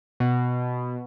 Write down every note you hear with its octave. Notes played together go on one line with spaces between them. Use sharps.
B2